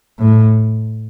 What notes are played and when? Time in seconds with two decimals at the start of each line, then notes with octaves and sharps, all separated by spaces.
0.19 A2